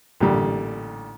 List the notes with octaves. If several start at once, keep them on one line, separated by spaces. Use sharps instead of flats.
A1 A#2 D3 G3